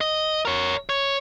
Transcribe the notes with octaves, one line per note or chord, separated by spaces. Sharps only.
D#5
A#4 C#5
C#5